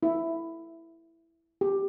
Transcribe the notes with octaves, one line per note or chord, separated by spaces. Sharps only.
E4
G4